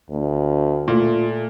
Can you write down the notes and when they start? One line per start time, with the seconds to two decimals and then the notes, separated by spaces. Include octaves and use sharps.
0.10 D2
0.88 A#2 A3 F4